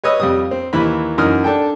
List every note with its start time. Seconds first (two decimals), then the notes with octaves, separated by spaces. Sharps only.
0.04 B4 C#5 D#5 D#6 E6
0.20 F2 G3 D#6
0.51 C4
0.73 D#2 E3 B5
1.18 F#2 E3 D#4 D#6 F6
1.44 D4 A4 G5